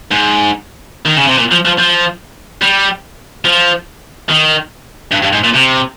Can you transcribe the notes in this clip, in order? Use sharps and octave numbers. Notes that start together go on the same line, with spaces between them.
G#2
D#3
C#3
C3
A#2
F3
F3
F3
G3
F3
D#3
G2
G2
G#2
A#2
C3